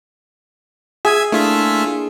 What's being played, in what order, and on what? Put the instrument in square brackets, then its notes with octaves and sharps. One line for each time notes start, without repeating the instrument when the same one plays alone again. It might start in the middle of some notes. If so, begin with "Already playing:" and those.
[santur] G#4 [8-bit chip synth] E5 G#5 G#6
[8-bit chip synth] A3 F4 E5 [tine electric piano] A#3 D4 E4